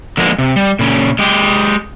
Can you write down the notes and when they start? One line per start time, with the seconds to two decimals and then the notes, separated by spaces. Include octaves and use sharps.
0.17 D3 F3 G#3 A#3 B3
0.38 C3
0.56 G3
0.79 A#2 C#3 C#4
1.19 G#3 G4